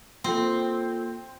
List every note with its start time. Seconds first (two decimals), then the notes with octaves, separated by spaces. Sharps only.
0.24 A#3 C4 F4 A4